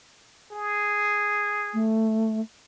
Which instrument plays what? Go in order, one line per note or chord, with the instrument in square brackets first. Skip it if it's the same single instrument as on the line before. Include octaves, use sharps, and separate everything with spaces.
[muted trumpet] G#4
[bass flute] A3